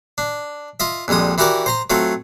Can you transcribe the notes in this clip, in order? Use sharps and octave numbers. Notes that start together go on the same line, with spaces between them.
D4
F4 D#5 E5
A#1 F2 G3 G#3 D#6
E3 E4 F#4 G4 A#4 D5
C5 A#5 C6
F#3 A3 C4 F4